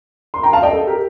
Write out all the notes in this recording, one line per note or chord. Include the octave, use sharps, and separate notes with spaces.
C6
G5 A#5
F5 A5
D#5 G5
A4
G4 A#4